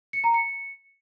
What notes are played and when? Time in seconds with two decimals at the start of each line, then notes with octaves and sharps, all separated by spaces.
0.13 C#7
0.24 A#5
0.34 C#7